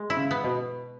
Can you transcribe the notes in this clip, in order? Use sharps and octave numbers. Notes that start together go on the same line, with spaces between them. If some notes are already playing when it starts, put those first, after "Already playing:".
Already playing: G#3
E4
C#3
B3
B2